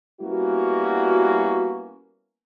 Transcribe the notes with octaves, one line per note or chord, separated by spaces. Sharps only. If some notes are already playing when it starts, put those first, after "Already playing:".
G3 A#3 B3 C#4 E4 F#4